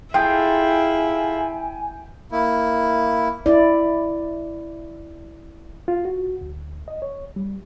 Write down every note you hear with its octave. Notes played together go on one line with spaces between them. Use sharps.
E4 F4 G#4 A4 G5 G#5
A#3 E4
E4 D5
F4
F#4
D2
D#5
C#5
G3